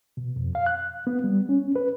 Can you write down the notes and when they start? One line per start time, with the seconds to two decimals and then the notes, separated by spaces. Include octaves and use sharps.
0.17 B2
0.36 F2
0.55 F5
0.66 F#6
1.07 B3
1.24 G3
1.49 C#4
1.76 B4